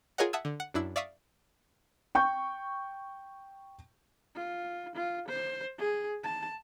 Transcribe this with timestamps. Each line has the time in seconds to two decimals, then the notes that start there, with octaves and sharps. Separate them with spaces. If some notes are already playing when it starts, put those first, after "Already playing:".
0.18 F4 G#4 A#4 C#5 D#5 F#5
0.33 E5 F#5 A5 D#6 E6 G#6
0.45 D3
0.60 F#5
0.74 F#2 D4 E4 E6
0.96 D5 E5 F5 C#6 D#6 B6
2.15 G5 C#6 G6
4.35 F4
4.95 F4
5.28 C5
5.78 G#4
6.23 A5